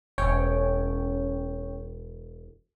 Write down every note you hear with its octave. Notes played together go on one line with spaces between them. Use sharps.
E1 C#4 C#5 G5